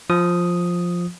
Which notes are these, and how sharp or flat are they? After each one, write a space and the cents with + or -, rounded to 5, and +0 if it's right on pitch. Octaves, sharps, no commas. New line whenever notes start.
F3 +5 D#6 +0